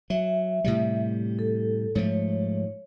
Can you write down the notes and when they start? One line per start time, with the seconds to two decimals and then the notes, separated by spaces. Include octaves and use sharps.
0.10 F#3 E5
0.64 A2 C3 G3
1.39 A4
1.95 G#2 F3 A3 C#5